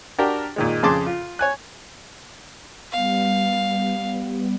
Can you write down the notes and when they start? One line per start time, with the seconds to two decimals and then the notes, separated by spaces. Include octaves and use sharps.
0.19 D4 F#4 G4 A#4 G5
0.56 A#2 D#3 G#3
0.83 F2 C#3 G#4 A5 C6 D6
1.06 F4
1.39 C#5 G#5 F#6
2.92 G3 B3 F5